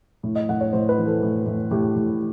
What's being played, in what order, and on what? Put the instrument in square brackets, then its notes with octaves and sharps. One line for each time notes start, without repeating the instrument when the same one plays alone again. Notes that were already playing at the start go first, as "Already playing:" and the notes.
[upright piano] A2
D#5
A2 F#5
C#5
A2 C5
B4
E3
A4
A2
A2
A2 G4
A2